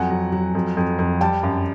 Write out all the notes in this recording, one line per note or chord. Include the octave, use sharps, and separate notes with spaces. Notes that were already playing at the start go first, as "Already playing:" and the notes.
Already playing: F2 F#3 F#5 G#5
F#3
F#3
F2
F2
F2
G3 G5 A5
F#2